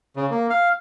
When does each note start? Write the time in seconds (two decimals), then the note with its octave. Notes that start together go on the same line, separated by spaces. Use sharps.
0.16 C#3
0.31 A#3
0.50 F5